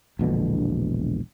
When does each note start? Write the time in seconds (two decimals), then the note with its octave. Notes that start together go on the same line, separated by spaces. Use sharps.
0.19 E1 A#1 B2 D3